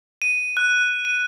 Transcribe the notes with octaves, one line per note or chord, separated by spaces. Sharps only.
D#7
F#6
D#7